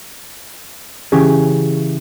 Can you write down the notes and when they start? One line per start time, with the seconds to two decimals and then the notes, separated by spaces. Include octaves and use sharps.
1.12 C#3 E3 C#4 G4 G#4